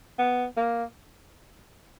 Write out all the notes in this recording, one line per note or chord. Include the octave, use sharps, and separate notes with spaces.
B3
A#3